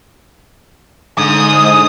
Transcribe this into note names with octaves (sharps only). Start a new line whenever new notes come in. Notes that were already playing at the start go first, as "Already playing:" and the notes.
G#2 D3 D#6